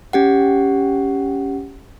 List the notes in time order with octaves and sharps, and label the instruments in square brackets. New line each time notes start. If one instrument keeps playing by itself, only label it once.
[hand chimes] C#4 G4 F#5